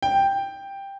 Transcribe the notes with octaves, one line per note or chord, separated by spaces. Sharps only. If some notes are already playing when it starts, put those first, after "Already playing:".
G5